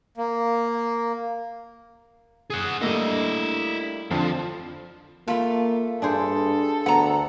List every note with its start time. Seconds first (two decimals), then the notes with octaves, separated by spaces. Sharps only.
0.17 A#3
2.50 G#4 F#5
2.82 G3 A3 A#3 E4 D#5
4.11 F2 D3 F3
5.28 A3 A#3 F4 A5 B5
6.02 G2 D4 G#4 A4 C5
6.86 D2 B3 F#5 A#5